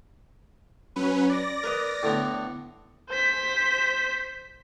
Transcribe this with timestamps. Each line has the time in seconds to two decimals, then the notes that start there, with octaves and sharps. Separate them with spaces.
0.96 F#3 C#4 B4
1.29 D5 A#6
1.63 A#4 B4 D#5
2.03 A2 D3 B3
3.09 C5 B6